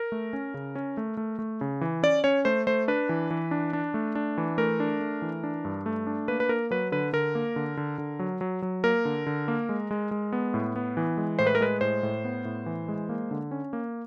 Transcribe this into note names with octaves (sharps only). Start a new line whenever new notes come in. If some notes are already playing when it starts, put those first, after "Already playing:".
Already playing: A#4
A3
C#4
C#3
C#4
A3
A3
A3
C#3
E3
C#4 D5
C#4 C#5
A3 C5
A3 C5
D4 B4
E3
E3
D4
D4
A3
D4
E3
A3 A#4
D4
A3
E3
D4
G2
A3
D4
A#3 B4
B4
A#3 A#4
F#3 B4
D3 B4
D3 A#4
A#3
D3
D3
D3
F#3
F#3
F#3
A#3 A#4
D3
D3
A#3
G#3
G#3
G#3
B3
A2
B3
E3
G#3
A2 C5
B4
A#4
G#3 B4
A2 C5
A2
B3
A2
E3
G#3
A#3
D3
C#4
A#3